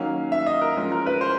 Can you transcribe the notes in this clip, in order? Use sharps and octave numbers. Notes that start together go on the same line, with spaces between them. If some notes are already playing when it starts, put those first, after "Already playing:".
Already playing: D#3 F#3 A#3 C#4 F5
E5
D#5
A#4
F3 G#3 C#4
A#4
B4
C5